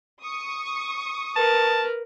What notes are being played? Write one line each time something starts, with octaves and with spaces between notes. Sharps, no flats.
C#6 D#6
A#4 B4 A5